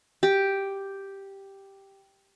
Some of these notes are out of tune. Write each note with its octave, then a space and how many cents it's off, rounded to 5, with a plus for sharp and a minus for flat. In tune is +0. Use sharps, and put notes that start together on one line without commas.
G4 +0